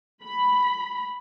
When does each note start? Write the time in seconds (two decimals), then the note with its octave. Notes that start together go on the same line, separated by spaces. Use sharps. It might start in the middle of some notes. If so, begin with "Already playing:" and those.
0.24 B5